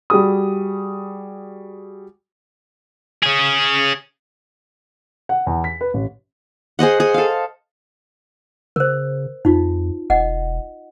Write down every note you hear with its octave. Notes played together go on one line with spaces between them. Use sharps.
G3 F#4 G#4 D#6
C#4 G#4
F#5
E2
B6
B4
A1
G#4 C5 D#5 F#5
G#4
A4 F5
C#3 A#4 C5
F2 D#4 F4
E1 D#5 F#5